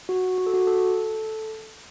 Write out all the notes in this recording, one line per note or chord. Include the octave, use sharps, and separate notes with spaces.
F#4
F#4
A4
F#4
A4